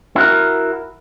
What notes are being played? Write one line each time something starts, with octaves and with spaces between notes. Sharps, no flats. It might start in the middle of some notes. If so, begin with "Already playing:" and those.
E4 F#4 A#4